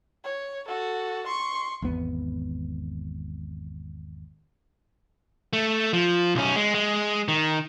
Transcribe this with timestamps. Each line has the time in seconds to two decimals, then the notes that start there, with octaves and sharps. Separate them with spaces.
0.24 C#5
0.68 F#4 A4
1.27 C6 C#6
1.82 G#1 E2 B3
5.53 A3
5.93 F3
6.35 B1 C#4
6.56 G#3
6.74 G#3
7.28 D#3